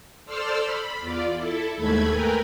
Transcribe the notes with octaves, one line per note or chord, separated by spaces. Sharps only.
A4 C5 D5 C6 E6 F6
B5
E2 F4 D5
E4 A4
D#2 G#2 A3 A4 B5 G#6
A#4 B4 G5 G#5 A#5